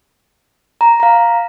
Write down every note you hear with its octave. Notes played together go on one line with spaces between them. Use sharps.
A#5
F5 A#5